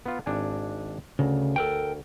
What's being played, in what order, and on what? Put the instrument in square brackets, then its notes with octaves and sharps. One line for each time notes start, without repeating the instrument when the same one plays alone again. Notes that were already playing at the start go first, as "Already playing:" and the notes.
[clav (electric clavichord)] B3 F4
G#1 D4 G#5
[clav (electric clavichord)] D2 [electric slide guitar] C#3
[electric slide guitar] A4 A#4 G5